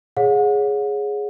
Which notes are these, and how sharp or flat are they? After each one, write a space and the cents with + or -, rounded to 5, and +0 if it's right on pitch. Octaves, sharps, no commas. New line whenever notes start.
G#4 +0 C#5 +0 F#5 -35